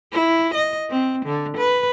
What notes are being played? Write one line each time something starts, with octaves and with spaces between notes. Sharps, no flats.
E4
D#5
C4
D3
B4